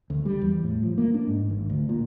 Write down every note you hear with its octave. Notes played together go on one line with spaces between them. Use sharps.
D2
G3
E2
A2
F3
A#3
D4
G#2
G#1
D2
A#2